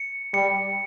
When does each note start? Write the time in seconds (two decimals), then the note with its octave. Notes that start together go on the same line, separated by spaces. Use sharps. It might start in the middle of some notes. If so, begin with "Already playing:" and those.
Already playing: C#7
0.34 G3 C#7